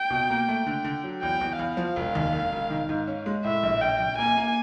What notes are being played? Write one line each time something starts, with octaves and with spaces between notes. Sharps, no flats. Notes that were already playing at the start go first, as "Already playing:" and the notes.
Already playing: G5
B2
A#3
A3
D3
D3
F#3
E2 G5
E2
E2 F5
F3
E1
D#2
E1
E1
D#3
G#2
C#4
G#3
A2 E5
A#1
A#1 G5
A#1
A#3 G#5
A#3